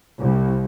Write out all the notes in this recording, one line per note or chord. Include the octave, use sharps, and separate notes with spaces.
C2